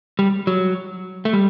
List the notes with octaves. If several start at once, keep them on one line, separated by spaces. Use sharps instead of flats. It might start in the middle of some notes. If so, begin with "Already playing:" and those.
G3
F#3
A3
G3